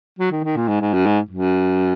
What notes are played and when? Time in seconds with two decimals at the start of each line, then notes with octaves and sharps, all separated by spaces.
0.19 F#3
0.32 D#3
0.44 D#3
0.56 A#2
0.68 G#2
0.81 G#2
0.93 F#2
1.06 G#2
1.31 F#2